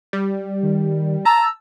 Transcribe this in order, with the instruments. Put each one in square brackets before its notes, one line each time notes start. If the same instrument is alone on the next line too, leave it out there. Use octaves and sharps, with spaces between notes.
[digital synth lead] G3
[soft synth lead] D#3
[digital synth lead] A5 [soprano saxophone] A#5 [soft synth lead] E6